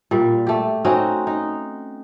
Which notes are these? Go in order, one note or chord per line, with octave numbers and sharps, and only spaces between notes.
A#2 G3
A3 G4
C4 C#4 D#4 F#4
D#4